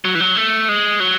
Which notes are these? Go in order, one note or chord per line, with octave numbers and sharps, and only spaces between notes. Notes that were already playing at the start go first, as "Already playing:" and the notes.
F#3
E3
F#3
A3
G#3
F#3